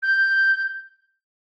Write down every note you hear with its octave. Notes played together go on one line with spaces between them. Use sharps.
G6